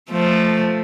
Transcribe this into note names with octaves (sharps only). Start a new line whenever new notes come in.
F3 A3